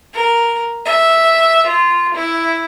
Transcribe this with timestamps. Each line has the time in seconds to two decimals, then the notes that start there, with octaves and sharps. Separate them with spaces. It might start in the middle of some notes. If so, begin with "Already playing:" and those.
0.14 A#4
0.85 E5
1.67 F4
2.14 E4